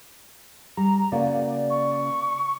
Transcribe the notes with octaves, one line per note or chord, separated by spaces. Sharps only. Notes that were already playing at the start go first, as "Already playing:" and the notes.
G3 A#5
C#3 A#3 F#4 D5
C#6